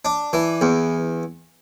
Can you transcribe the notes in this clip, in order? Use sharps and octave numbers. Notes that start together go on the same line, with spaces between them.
D4
E3
E2